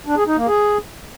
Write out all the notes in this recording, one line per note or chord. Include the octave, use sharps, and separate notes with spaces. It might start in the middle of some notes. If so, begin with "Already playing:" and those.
D4
G#4
D#4
A#3
G#4